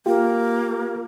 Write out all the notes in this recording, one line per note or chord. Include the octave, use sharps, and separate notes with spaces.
A#3 F4 G4